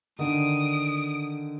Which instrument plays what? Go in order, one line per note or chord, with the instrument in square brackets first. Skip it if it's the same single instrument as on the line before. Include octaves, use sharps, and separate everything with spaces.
[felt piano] D3 D#3 [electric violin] D#6 D7